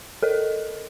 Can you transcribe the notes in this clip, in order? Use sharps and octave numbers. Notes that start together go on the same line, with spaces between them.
A4 A#4 D#5